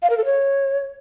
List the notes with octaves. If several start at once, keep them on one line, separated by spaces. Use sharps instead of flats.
F5
A#4
A4
C#5